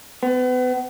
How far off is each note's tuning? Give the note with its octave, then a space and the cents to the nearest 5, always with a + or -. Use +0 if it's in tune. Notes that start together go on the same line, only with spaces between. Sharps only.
B3 +35